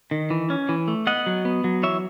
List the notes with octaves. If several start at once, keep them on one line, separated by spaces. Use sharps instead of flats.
D#3
E3
C#4
E3
A3
B3 D#5 F#5
F#3
B3
F#3
E3 C#5 E5